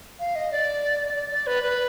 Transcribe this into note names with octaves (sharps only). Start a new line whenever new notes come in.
F5
D#5
D5
D5
D5
B4
B4